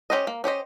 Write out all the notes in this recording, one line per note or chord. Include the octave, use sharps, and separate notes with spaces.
C#4 G4 C5 D#5
A#3
C#4 G4 C5 D#5